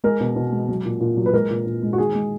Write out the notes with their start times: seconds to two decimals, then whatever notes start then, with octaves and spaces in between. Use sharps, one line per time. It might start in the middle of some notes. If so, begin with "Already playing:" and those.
0.04 G#3 A#4
0.20 B2
0.36 B2
0.52 G#3
0.68 F#3
0.85 A#2
1.01 A#2
1.17 F#3
1.26 B4
1.34 G#3 A#4
1.50 A#2
1.66 A#2
1.82 G#3
1.93 F#4
1.98 D#3 G#4
2.15 G#3